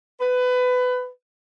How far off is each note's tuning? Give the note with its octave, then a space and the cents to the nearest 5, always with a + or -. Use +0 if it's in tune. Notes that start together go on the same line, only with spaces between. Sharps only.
B4 +20